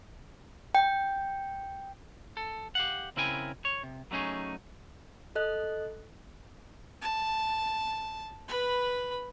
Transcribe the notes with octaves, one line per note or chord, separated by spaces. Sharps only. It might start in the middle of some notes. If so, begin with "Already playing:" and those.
G5
A4
G4 F5 F#5
C#3 C4 E4 A#4 G5 G#5
C#5
C3
F#3 A3 C#4 D#4 G#4
A4 D#5 F#6
A5
B4 B5